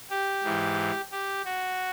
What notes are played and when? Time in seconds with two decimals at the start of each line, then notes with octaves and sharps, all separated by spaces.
0.10 G4
0.44 G#2 E3
1.12 G4
1.45 F#4